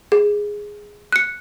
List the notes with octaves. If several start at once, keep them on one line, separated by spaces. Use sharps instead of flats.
G#4
F#6 C#7